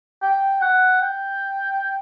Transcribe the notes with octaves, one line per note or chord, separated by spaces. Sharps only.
G5
F#5
G5